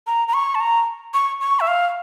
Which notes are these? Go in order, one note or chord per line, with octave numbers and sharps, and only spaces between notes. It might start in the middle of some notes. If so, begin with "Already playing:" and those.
A#5
A#5
C#6
A5
A#5
C#6
C#6
E5
F5